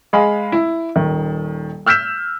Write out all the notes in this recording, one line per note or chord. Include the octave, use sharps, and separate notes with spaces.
G#3 G#4 F5 B5
E4
D#1 D#3
E6 F6 G6 B6 E7